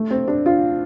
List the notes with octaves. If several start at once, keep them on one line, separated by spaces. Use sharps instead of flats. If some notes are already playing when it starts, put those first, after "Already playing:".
Already playing: A3
C4
D4
F4